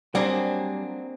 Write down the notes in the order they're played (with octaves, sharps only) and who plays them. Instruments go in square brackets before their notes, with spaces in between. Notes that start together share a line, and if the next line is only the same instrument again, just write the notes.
[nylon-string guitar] F#3 D4 [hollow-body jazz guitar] G3 [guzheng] A#3 C4 G#4 [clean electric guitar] D5 F#5